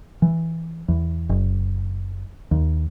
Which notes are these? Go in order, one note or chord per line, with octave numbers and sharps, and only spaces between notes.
E3
E2
F#1
D#2